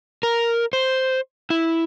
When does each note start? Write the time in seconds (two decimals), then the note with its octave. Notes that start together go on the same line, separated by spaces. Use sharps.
0.23 A#4
0.73 C5
1.50 E4